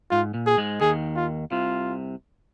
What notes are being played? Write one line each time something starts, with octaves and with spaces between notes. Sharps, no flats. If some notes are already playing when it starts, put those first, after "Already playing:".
G#2 F4
A#2
G#4
G#2 G#3
D#2 D#3 G#4
F4
C2 C3 F4